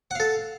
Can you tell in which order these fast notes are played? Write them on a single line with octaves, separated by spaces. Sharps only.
F#5 F5 A4